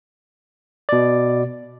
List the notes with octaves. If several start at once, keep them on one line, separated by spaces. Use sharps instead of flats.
B2 D5